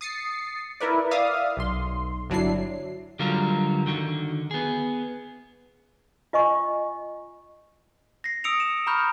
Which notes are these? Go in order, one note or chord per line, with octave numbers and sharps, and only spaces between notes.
D#6 A6 C7 C#7
E4 A#4 B4 D5
D5 E5 F5 D#6
B1 C6
G1 F#3 D4 E4 C7
D3 F#3 G3 F4 F#4 A#4
D3 D#3 F#4
B3 G#4
F4 D#5 G#5 C#6
A#6 C7
D#6 E6 C#7 D7 F7
E7
A#5 B5 C#6 F6 G6